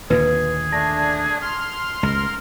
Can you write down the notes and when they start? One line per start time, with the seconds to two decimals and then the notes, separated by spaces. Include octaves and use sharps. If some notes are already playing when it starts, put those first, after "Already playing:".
0.10 D#2 A#2 D3 G#4 B4
0.72 A3 D4 A5 A#6
1.42 C6 F6
2.03 C#2 A#4